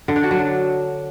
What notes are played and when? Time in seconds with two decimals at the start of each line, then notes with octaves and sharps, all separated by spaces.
0.08 D3
0.16 D4
0.23 F#4
0.31 F#3
0.38 D4